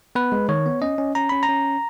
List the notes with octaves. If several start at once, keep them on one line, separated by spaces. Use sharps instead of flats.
B3 B4
G#3
D#3 C#5
B3
C#4 D#5
C#4
C#4 A#5
C#4 B5
A#5
C#4